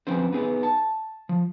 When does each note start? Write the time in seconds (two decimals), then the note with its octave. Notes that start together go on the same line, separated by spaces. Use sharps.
0.07 F3 C4 C#4 B4 C5
0.33 B3 D#4 G#4 B4
0.63 A5
1.29 F3